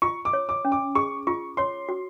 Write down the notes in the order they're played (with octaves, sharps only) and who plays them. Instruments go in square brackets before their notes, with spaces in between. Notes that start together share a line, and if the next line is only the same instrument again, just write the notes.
[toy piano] F4 [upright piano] C#6
[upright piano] D6
[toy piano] C#5
[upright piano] D6
[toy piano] C#4
[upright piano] D6
[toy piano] G#4 [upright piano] C#6
[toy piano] F4 [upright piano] C#6
[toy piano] C#5 [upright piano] C6
[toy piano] F#4